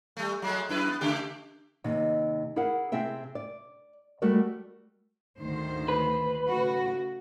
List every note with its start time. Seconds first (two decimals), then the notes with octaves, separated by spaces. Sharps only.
0.17 G3 A3
0.42 F#3 G#3 A3
0.69 F#2 E4 B4
0.88 B3
1.01 C#3 A3 G4
1.84 D#2 C3 D#5
2.56 E4 G#4 A#4 F5 F#5
2.92 C3 C4 G#4 E5 G5
3.35 D5
4.22 G3 A3 F#4 A#4 D5
5.40 D2 D#3 C5
5.88 B4
6.48 C#3 A3 F#4